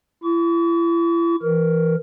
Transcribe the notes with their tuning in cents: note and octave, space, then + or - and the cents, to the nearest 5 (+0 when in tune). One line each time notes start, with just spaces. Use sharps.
E4 +35 C#6 +45
E3 +15 A#4 +0